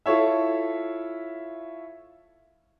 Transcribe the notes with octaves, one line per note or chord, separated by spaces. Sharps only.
E4 F4 A4 C#5 E5